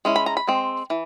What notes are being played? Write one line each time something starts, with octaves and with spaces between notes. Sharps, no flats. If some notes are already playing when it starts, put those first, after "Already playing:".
G#3 C#4 E4
B5
A#5
B5
G#3 C4
E3